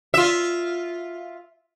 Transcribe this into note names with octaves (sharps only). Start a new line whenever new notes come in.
F4 E5